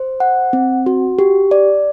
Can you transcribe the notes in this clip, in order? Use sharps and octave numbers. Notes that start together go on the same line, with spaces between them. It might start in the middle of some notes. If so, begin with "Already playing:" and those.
Already playing: C5
F#5
C4
F#4
G4
D5